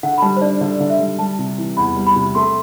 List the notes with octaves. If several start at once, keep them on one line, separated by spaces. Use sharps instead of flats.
D3 F#5
B5
G3 A5
C5
D4 D5
D3 D5
D3
E5
G3
G3 A5
C3
E3
E2 B5
G3
B5
C3
A3 C6